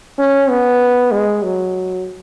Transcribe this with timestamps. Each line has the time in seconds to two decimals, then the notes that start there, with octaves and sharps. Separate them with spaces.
0.18 C#4
0.49 B3
1.11 G#3
1.43 F#3